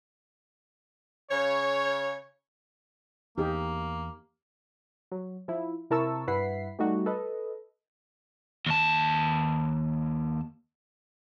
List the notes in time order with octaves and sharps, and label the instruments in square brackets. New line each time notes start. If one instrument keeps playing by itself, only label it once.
[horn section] C#3 C#5
[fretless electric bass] E2 [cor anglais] A#3 [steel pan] D#4 G4 G#4
[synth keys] F#3
F3 E4
C3 E4 A#4 A5 C#6 E6
G2 E4 B4 F#5 B6 C7
G3 A3 D#4 F#4 G4
A4 B4 D#5
[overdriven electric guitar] D#2 A5